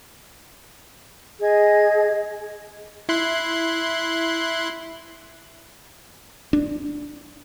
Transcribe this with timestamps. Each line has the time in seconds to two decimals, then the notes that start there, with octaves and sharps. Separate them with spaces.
1.40 G#4 D#5 G#6
3.09 E4 C6 F#6
6.53 D4